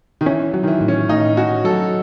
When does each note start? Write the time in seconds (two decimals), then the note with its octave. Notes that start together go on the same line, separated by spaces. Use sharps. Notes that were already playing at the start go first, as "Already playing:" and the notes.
0.21 D#3
0.26 E3 C#4
0.54 F#3
0.63 D#3
0.67 E3
0.81 A2
0.88 C#4
1.09 A2 D#4
1.37 C#4 F#4
1.64 F#3 A4